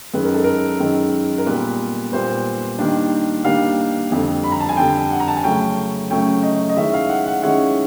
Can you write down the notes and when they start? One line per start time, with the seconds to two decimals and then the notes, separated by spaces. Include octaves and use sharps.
0.14 F#2 D#3 G#3 B4
0.24 A#4
0.34 A4
0.44 A#4
0.80 F#2 D#3 G#3
1.38 A#4
1.46 A#2 G3 B3 B4
2.12 A#2 G3 B3 C5
2.79 D#3 G3 A#3 D4
3.44 D#3 G3 A#3 D4 F5
4.12 F2 D3 G3
4.44 B5
4.52 A#5
4.60 A5
4.69 G#5
4.77 F2 D3 G3 G5
5.11 F#5
5.20 A#5
5.28 A5
5.37 G#5
5.43 C#3 F#3 A3 C#4 G5
6.10 C#3 F#3 A3 C#4 G5
6.43 D#5
6.69 D#5
6.76 D#3 G#3 C#4 E4 E5
6.94 F5
7.09 F#5
7.26 F#5
7.42 D#3 G#3 C#4 E4 F#5